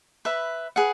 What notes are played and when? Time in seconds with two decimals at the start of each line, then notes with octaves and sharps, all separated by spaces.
0.25 B4 E5 B5
0.76 G#4 B4 F#5